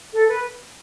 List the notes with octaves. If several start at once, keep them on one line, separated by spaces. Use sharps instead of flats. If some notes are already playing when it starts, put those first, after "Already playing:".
A4
B4